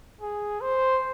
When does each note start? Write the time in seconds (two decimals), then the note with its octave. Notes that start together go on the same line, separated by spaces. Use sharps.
0.21 G#4
0.61 C5